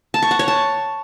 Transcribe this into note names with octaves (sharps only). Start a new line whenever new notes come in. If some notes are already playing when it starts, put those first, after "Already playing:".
A5
C#6
F#5
C#5
A5